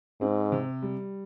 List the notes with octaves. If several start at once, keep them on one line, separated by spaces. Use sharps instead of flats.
G#2 C4
C3
G3